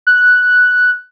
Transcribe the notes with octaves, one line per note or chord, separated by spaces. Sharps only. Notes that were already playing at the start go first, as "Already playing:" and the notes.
F#6